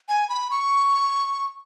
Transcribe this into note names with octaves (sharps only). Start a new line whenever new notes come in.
G#5
B5
C#6